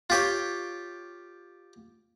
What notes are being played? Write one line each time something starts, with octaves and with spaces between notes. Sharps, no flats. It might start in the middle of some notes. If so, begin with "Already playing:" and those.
F4 G4 C#5